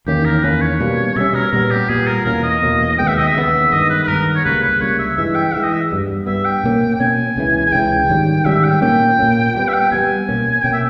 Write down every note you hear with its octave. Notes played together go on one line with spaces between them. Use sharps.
E2 D#3 A#3 C#4 G4
A#4
E2 D#3 A#3 C#4 B4
C#5
B2 G3 A#3 C#4
B2 G3 A#3 C#4 E5
A#4
A#2 G3 B3 A#4
G4
A#2 G3 B3 G#4
A#4
E2 B2 A#3 C#4 A#4
D#5
E2 B2 A#3 C#4
D#2 C#3 G#3 B3 G5
E5
D#5
E5
D#2 C#3 G#3 B3
G2 D#3 G#3 B3 D#5
B4
B4
G2 D#3 G#3 B3 A#4
C#5
C#2 C#3 G3 A#3 B4
B4
C#2 C#3 G3 A#3 C#5
E5
G2 E3 G#3 E5
G5
G2 E3 G#3 E5
D#5
E5
G2 G3 B3
G2 G3 B3 E5
G5
B2 A#3 C#4
G5
B2 A#3 C#4 G#5
C#2 C#3 E3
G#5
C#2 C#3 E3 G5
G#2 D#3 G3 C#4
G#2 D#3 G3 C#4 E5
G5
A#2 A#3 C#4 G5
A#2 A#3 C#4
G2 G3 B3 G5
E5
G5
G2 G3 B3 G#5
B2 A#3 C#4
B2 A#3 C#4 G5
E5